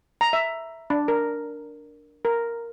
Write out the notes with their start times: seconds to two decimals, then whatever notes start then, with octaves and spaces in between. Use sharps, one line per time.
0.21 A#5
0.33 E5
0.90 D4
1.08 A#4
2.25 A#4